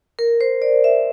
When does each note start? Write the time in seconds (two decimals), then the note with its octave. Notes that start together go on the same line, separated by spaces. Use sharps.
0.19 A#4
0.41 C5
0.62 D5
0.84 E5